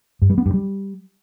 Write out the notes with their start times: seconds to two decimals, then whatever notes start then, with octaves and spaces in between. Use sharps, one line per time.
0.22 G2
0.30 G3
0.38 B3
0.46 G2
0.54 G3